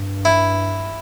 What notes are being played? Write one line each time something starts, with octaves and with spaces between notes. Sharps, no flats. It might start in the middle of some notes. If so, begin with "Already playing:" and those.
Already playing: G2
E4